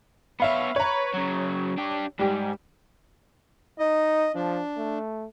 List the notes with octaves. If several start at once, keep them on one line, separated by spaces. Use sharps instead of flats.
B3 C#5 E5 F5 B5
B4 C#5 A#5
C#3 F#3
D4 G4
G#2 G3 G4
D#4 D#5
F3 D4
A3